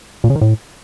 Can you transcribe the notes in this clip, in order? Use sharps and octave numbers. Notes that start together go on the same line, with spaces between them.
A#2
C#3
D#3
A2